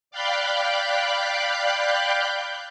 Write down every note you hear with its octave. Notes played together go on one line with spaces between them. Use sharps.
D5 F5 G5 B5 F#6 G6